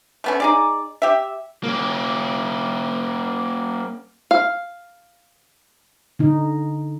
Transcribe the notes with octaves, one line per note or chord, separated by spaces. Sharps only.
A3 B3 C#4
D#4 G#4 D5
G4 E5
A#3 C#4
F5
D3 D#4